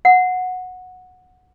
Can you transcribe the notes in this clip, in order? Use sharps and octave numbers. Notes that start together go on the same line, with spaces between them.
F#5